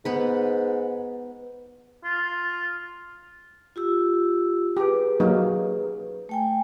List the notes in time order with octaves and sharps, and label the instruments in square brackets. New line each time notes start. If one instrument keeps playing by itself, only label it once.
[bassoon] G#2 [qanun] B3 B4
[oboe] F4
[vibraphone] F4 G4 E6
[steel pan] G4 [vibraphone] G#4 B4
[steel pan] F#3 A#3 D#4
[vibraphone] A3 G5 G#5